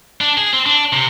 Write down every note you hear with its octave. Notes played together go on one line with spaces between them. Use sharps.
D4
G#4
C4
D4
C3